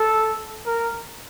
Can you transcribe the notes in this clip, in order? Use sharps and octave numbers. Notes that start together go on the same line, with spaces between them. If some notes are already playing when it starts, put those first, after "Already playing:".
Already playing: A4
A#4